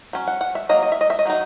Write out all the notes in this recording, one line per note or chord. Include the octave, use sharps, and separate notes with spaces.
F#3 C#4
F#5
F#5
E5
F#3 A#3 D#5
D#5
E5
D#5
E5
D#5
D#3 F#3 D#4